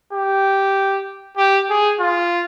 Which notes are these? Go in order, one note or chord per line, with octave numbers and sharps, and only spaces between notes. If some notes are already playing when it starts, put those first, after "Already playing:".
G4
G4
G#4
F4